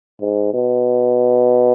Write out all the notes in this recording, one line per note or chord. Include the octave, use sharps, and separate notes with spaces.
G#2
B2